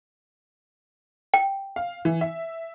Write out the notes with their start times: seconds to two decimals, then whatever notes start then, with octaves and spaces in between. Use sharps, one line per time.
1.34 G5
1.76 F5
2.05 E3
2.21 E5